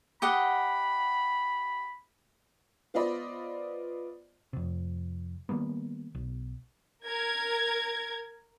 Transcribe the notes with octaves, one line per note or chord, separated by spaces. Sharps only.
G4 D#5 F#5 B5
B3 F4 C5 D5 D#5 B5
F2 C3
D#3 G3 A#3 B3
B1
A#4 G#6